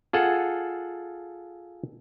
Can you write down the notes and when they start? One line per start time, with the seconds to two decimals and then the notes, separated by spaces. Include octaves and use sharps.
0.13 F4 G#4 A4 F#5